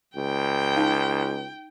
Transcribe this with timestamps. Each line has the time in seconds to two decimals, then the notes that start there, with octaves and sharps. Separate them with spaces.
0.17 C#2 G5
0.76 D#4 F5 A5